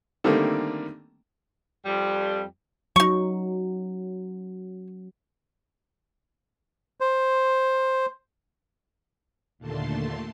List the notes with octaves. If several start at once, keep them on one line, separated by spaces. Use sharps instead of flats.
D3 D#3 G3 A3 A#3 C4
F2 G3
F#3 D#4 C#6
C5
D#2 A#2 D3 A3 A5 C6